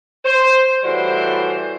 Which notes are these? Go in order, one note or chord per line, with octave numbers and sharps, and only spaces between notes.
C5
A2 E3 G3 F#4 C5